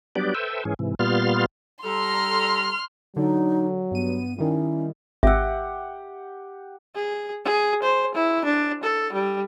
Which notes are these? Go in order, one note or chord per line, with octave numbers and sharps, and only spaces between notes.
F#3 G3 B3 D4 G4 D5
A4 B4 C5 E5 G5
G#2 E3 C#4 G#4
G#2 C3 E3
A#2 G3 B3 F4 C6 F6
G3 A4 A#5 C6 F6
D3 F#3 D#4
G2 B3 D#7
D#3 G3 C#4 E4
G#1 G4 E5 F#5 E6
G#4
G#4
C5
E4
D4
A4
G3